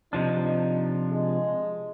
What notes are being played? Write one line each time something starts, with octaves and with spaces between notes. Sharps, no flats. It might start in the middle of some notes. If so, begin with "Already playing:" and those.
C3 F3 D4 D#4
G#3